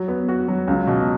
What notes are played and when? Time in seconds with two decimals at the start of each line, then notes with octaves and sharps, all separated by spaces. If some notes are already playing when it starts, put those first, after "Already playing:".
Already playing: F#3
0.08 B3
0.29 F#4
0.48 F#3
0.68 C#2
0.87 B2